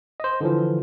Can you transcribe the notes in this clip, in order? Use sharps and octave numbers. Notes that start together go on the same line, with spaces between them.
C5 D#5
D3 E3 F3